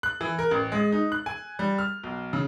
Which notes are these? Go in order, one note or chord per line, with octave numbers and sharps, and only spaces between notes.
F#6
E3
A#4
A1
G#3
D#4
F#6
G#5
G3
F6
B1
C#3